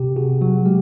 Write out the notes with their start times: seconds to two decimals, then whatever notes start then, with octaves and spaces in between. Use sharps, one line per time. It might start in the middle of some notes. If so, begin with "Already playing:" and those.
Already playing: C3 G4
0.16 C3 F#4 G#4
0.41 F#3 F#4
0.65 G#3 G4